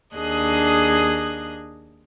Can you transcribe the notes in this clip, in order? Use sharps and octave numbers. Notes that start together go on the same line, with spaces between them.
D#2 D4 G#4 D#5 F#6